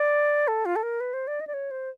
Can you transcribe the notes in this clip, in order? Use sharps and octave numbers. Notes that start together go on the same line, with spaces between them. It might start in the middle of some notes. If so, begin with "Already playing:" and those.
Already playing: D5
A4
F4
A4
A#4
B4
C5
D5
D#5
D5
C#5
C5